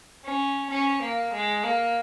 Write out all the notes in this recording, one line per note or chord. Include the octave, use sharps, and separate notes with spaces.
C#4
C#4
A#3
G#3
A#3